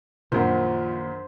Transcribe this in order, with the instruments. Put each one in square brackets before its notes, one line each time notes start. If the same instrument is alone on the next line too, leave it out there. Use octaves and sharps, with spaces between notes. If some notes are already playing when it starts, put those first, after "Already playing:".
[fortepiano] A#1 F#2 [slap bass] D#3 A#3 [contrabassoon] F3 [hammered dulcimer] C5